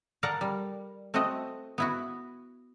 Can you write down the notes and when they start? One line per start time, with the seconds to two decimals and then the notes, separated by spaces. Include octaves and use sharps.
0.23 A4 A#4 D5 F5 F#5
0.41 G3
1.14 A3 C4 F#4 A4 D#5
1.78 B3 E4 F#4